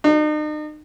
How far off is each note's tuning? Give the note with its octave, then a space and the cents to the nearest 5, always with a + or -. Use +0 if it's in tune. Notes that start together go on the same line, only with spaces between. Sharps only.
D#4 -40